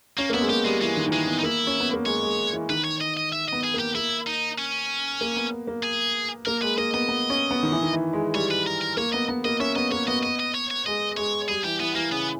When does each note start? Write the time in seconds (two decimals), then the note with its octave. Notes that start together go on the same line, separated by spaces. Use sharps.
0.17 A#3 C#4
0.30 A#3
0.34 B3 E4
0.41 G#3
0.49 A#3 G4
0.65 G3 G#3
0.81 E3 G#3
0.97 D#3
1.07 D#3
1.12 E3 G#3
1.27 B3
1.39 D#4
1.43 A#3 E4
1.67 C#4
1.80 B3
1.93 A#3
2.06 G#3 C#5
2.23 G#3
2.53 E3
2.70 D#3 B4
2.84 C#5
3.01 D#5
3.17 D#5
3.32 E5
3.48 B3 D#5
3.64 G#4
3.74 A#3
3.79 G4
3.95 A#3 E4
4.27 D#4
4.58 C#4
5.21 A#3
5.37 B3
5.67 A#3
5.83 G#4
6.46 A#3 A#4
6.62 G#3 B4
6.78 A#3 D#5
6.94 B3 D#5
7.09 B3
7.30 C#4
7.51 B3
7.63 D#3
7.72 E3
7.83 D#3
7.93 E3
8.13 G#3
8.35 G3 C#5
8.51 B4
8.67 A#4
8.81 A#4
8.97 A#3 C#5
9.13 B3 D#5
9.29 B3
9.45 A#3 D#5
9.60 C#4 E5
9.76 B3 D#5
9.92 A#3 C#5
10.07 B3 D#5
10.23 D#5
10.40 D#5
10.54 C#5
10.71 C#5
10.86 G#3 D#5
11.17 G#3 C#5
11.48 G3 G#4
11.64 E3 G4
11.80 E3 B3
11.96 E3 A#3
12.11 C#3 B3